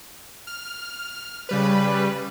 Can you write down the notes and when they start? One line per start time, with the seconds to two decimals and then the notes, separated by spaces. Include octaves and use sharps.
0.47 F6
1.49 C#3 G3 B4